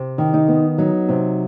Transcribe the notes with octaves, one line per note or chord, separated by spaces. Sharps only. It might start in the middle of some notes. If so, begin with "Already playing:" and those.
Already playing: C3
D#3
D#4
B3
F#3 D#4
C3